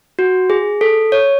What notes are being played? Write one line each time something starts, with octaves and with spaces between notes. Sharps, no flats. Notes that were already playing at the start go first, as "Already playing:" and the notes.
F#4
G#4
A4
C#5